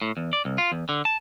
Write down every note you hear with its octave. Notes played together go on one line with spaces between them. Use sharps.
A2
E2
D5
C2
F4
E2
D3
A5